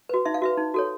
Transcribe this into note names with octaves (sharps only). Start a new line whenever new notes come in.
F#4 B4
D#4 E5
F5
F#4 B4 E5
D#4
F#4 A4 C#5